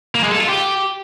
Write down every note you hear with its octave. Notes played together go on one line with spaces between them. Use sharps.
A#3
G#3
A4
F4
G4